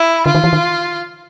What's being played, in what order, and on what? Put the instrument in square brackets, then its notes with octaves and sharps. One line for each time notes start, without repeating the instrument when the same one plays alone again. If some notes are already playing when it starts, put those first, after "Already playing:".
Already playing: [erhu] E4
[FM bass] D3 [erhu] F4
[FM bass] D#3
E3
D#3